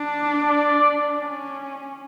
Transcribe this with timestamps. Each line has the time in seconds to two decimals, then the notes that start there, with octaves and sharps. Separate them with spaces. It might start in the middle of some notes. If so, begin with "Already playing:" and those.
Already playing: D4
0.44 D5
1.19 C#4